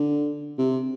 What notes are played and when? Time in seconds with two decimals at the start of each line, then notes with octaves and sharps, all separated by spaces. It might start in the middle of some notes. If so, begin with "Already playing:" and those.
Already playing: D3
0.58 C3